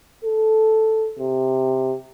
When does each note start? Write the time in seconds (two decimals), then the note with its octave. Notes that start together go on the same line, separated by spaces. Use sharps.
0.25 A4
1.19 C3